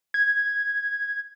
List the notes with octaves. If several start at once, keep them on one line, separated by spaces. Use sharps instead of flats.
G#6